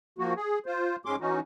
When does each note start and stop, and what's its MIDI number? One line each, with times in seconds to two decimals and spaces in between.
0.19 0.34 53
0.19 0.34 58
0.19 0.34 66
0.36 0.59 68
0.66 0.96 65
0.66 0.96 72
1.05 1.16 44
1.05 1.16 56
1.05 1.16 61
1.05 1.16 84
1.05 1.16 86
1.20 1.40 52
1.20 1.40 61
1.20 1.40 63
1.20 1.40 66